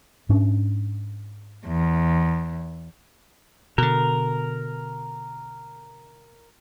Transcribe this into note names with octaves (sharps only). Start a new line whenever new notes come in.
G#2 C#4 D4
E2
B2 D3 A#4